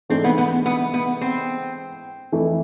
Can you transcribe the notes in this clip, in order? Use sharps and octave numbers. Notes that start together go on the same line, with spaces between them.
G#2 E3 A3 C4 D4 G#4
B3
B3
B3
B3
C4
F2 E3 A3 E4 A4